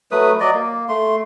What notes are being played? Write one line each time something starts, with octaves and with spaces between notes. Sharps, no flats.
F#3 A3 B4 D#6
F#3 D5 D#5
A#3
A3 C6